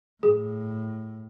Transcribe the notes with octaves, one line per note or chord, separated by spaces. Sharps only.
A2 G#4